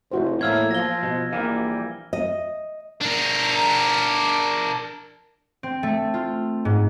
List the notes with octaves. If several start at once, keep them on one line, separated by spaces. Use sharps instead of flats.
F1 E4 F#4 C5
E2 A2 A#3 E6 F6 G#6
F3 A#6 G7
B2
A#1 E3 G3 A#3 F5
D#5
D4 A#4
C4
A3
F4
G#2